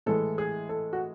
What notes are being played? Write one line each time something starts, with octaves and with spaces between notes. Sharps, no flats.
A2 E3 G#3 A4
G#4
A4
F#4